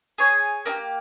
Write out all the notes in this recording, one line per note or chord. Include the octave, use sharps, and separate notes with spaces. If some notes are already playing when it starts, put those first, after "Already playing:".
G#4 C#5 G#5
A#3 D#4 G4